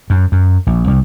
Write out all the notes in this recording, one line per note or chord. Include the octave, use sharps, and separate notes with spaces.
F#2
F#2
A#1
C2